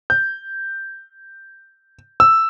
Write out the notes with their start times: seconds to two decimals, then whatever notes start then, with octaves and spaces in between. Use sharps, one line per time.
0.10 G6
2.20 E6